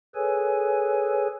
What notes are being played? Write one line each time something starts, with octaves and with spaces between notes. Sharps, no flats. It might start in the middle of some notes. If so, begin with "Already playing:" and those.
G#4 A4 B4 C#5 G#5